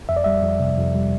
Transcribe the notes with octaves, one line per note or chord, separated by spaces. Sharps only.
F2 E5
D5
G3 E5
F2
C3
F2
G3